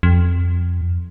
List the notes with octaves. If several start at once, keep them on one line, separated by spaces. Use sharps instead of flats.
F2